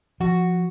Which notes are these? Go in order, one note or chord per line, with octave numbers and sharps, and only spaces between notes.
F3 F#4